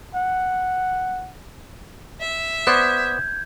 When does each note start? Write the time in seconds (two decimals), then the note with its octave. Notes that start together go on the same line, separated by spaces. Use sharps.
0.15 F#5
2.21 E5
2.67 B3 C5 D5 G6 G#6